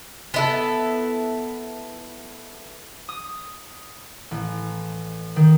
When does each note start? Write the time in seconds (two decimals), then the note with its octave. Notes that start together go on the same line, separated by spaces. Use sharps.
0.34 B3 E4 A4
3.09 D#6
4.31 A1
5.36 D#3